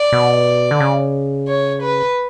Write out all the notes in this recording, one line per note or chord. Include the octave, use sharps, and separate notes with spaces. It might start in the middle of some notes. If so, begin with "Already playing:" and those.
Already playing: D5
B2
D3
C#3
C#5
B4